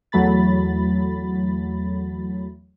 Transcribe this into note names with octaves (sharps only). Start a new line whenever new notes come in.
E2 F#3 A3 B5 A6